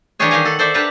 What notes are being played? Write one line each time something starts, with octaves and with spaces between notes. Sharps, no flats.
E3 G3 D4 G4 G#4 C#5
D#3 G4 D#5 F5 G#5 A#5
A4 F#5
A4 C5 D5 E5
D4 G4 B4 E5 A5 A#5